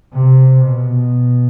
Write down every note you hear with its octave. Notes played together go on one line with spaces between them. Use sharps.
C3
B2